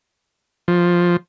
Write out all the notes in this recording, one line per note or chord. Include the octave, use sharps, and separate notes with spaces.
F3